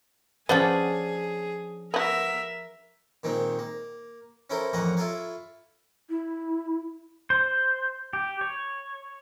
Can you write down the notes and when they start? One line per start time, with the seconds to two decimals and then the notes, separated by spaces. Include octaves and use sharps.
0.49 F3 C#4 D4 G#4 B4 C5 F#5
1.94 B3 F#4 A#4 E5
3.23 A#2 D#3 G#3 C4
3.59 A#3
4.50 C#4 E4 A4 A#4 C5
4.73 A1 F2 A#3 C#4 D#5 F#5
4.97 E4 F4 A4 C#5 F5
6.10 E4
7.30 C5
8.13 G4
8.41 C#5